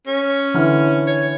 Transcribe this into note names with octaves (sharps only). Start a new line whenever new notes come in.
C#4
D3 E3 F6
C#5